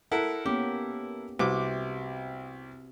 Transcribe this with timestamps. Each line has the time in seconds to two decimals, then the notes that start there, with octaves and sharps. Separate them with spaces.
0.12 E4 A4 A#4 F#5
0.46 A#3 B3 C#4 G4
1.39 C2 C3 F#4 B4 D6